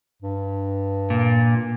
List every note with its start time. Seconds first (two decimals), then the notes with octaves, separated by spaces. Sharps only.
0.22 G2
1.10 A#2